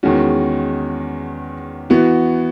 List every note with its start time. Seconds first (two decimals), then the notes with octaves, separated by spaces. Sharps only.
0.03 E2 D#3 G#3 C#4 F#4
1.90 E3 B3 F#4